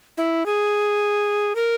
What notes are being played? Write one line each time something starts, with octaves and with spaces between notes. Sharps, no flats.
E4
G#4
A#4